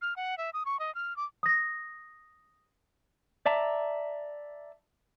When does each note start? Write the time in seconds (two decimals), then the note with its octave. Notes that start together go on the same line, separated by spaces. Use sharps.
0.02 F6
0.16 F#5
0.38 E5
0.54 D#6
0.65 C#6
0.80 D#5
0.95 F6
1.17 D6
1.43 D#6 A#6
3.46 D5 E5 A5 A#5